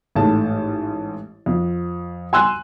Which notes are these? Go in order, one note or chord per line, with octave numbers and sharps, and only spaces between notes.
A1 G#2 A3 A5
F2
G#5 C6 E6 F#6